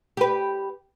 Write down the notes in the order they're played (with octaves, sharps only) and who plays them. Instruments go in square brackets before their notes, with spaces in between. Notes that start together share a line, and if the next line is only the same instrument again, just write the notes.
[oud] G4 B4